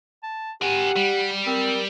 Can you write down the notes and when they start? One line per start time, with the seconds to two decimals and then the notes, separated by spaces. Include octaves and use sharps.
0.23 A5
0.62 G4 A#4 F#5 G#5
0.96 G3
1.47 C4 A#4